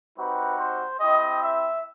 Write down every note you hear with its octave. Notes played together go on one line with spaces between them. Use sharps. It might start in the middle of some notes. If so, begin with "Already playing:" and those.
G3 C4 D#4 F#4 B4
C5
C4 E4 G4 D#5
E5